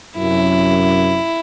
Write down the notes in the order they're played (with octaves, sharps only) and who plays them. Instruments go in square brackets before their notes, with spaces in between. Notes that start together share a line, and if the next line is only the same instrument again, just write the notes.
[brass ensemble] F#2 C3 [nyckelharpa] E4